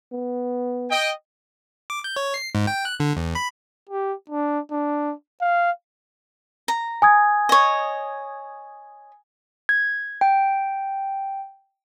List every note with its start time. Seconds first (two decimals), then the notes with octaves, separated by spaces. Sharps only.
0.13 B3
0.91 D#5 G5
1.90 D6
2.04 G6
2.16 C#5
2.34 C7
2.55 G#2
2.67 G5
2.85 F#6
3.00 D3
3.17 E2
3.35 B5
3.89 G4
4.30 D4
4.71 D4
5.41 F5
6.68 A#5
7.02 G#5 D#6 G#6
7.49 C#5 D#5
9.69 G#6
10.21 G5